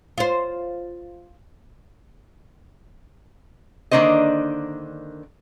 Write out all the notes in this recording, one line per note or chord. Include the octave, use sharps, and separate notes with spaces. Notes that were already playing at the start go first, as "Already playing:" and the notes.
F4 C5
D3 D#3 A#3 D4 C5 D#5